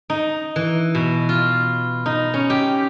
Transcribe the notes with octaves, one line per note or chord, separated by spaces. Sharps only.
D#4
E3
B2
F4
D#4
C#4
G4